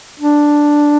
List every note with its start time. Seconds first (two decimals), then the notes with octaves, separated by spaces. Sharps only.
0.20 D4